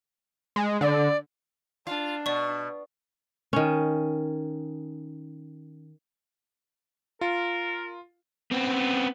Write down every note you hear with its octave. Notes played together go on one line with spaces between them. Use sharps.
G#3
D3 D5
D4 F4
B2 D5 C#6
D#3 C#4
F4 A#4
B3 C4